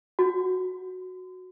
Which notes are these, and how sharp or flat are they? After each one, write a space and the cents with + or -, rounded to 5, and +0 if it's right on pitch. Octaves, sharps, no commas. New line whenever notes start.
F#4 -5